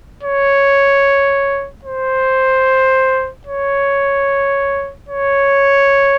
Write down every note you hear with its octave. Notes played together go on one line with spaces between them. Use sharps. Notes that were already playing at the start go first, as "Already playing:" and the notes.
C#5
C5
C#5
C#5